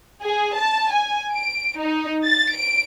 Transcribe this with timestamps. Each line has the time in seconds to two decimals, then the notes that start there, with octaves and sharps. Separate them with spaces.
0.23 G#4
0.57 A5
0.92 G#5
1.33 D7
1.79 D#4
2.25 A6
2.54 D7